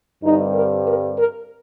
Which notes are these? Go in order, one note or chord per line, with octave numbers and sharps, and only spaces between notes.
G2 D3 G3 C4 D#4
A#4
A#4
A#4